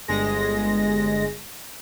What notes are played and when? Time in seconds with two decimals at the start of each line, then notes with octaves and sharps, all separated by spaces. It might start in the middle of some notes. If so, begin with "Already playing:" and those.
0.08 G1 G#3 A#6